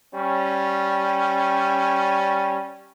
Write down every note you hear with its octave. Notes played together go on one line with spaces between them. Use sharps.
G3 C#4